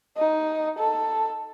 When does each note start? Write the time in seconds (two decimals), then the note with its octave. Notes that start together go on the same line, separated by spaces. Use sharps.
0.17 D#4
0.79 A4